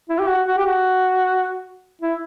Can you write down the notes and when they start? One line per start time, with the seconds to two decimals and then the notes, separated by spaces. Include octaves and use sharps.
0.09 E4
0.19 G4
0.29 F#4
0.48 F#4
0.57 G4
0.66 F#4
2.01 E4